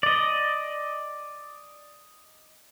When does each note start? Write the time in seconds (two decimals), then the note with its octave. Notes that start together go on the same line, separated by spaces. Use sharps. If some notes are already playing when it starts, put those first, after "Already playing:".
0.03 D5 D#5